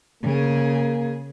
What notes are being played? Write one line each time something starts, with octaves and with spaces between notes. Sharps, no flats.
C#3 A#3 G#4